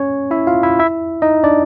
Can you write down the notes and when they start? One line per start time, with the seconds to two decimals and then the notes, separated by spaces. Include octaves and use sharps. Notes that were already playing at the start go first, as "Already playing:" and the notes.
Already playing: C#4 C#5
0.31 E4 E5
0.47 F4 F5
0.63 E4 E5
0.79 E4 E5
1.22 D#4 D#5
1.44 D4 D5